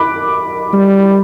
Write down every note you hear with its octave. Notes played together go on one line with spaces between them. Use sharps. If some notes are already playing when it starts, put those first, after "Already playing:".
Already playing: B5 D6 F#6
G3